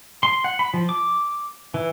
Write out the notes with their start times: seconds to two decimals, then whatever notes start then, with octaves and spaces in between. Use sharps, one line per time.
0.23 C6
0.44 F#5
0.59 B5
0.74 F3
0.89 D6
1.74 E3